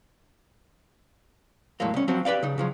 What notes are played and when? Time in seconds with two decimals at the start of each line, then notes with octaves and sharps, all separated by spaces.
1.80 E2 A2 F#3 G#3 A#3
1.94 C2 C#4
2.08 F3 F#3 C4 F#4
2.25 G4 B4 D5 F5
2.43 C#3 D#4
2.58 C#3 F3 F#3